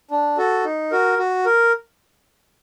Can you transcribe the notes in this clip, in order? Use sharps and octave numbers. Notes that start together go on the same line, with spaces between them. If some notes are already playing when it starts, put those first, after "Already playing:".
D4
F#4 A4
D#4
F#4 A#4
F#4
A#4